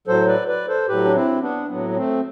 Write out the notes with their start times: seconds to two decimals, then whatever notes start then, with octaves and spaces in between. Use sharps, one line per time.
0.07 A2 F#3 A4 C5
0.27 B4 D5
0.48 B4 D5
0.68 A4 C5
0.88 A2 F#3 G4 B4
1.05 D4
1.15 C4 E4
1.42 B3 D4
1.69 A2 F#3 B3
1.89 B3
1.96 A3 C4